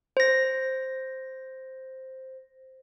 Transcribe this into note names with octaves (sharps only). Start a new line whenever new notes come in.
C5 A#6